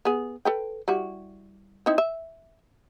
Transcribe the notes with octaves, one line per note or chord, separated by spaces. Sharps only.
B3 G#4
A4 B4 G5
G3 E4 F#4
C4 D#4 E4
E5